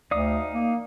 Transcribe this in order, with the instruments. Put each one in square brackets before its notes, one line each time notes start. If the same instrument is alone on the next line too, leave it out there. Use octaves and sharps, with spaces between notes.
[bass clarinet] D2 [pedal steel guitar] D#4 F5 D#6 [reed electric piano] D5
[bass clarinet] A#3